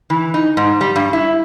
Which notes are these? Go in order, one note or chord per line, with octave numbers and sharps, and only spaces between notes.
E3
D#4
G#2
G3
G2
E4